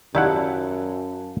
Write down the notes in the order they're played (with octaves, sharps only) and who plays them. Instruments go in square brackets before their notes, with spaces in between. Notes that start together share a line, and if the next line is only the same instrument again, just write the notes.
[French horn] F#2 [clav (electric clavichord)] D#3 E4 F#5 [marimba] G4 D5 [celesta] F5 A5